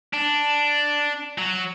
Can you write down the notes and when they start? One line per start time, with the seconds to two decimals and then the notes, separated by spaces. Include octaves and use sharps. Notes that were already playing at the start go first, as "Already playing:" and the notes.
0.13 D4
1.38 F#3